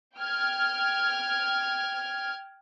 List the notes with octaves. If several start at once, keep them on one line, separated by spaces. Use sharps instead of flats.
G5 F6 G#6